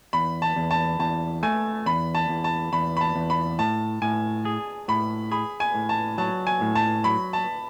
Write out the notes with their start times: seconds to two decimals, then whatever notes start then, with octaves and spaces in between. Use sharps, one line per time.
0.13 E2 B5
0.42 A5
0.56 E2
0.71 A5
0.99 E2 A5
1.43 A3 G#5
1.86 E2 B5
2.15 A5
2.29 E2
2.44 A5
2.73 E2 B5
2.97 B5
3.01 A5
3.16 E2
3.30 B5
3.59 A2 A5
4.02 A2 G#5
4.45 G#4
4.88 A2 B5
5.31 G#4 B5
5.60 G#5
5.75 A2
5.89 A5
6.18 F#3 A5
6.47 G#5
6.61 A2
6.75 A5
7.04 F#3 B5
7.33 A5